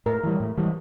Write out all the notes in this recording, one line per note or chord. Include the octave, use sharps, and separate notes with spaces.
A2 A#4
E3 G3
A2
E3 G3